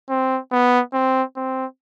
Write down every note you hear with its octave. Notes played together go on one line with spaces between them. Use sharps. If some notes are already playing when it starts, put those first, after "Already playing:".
C4
B3
C4
C4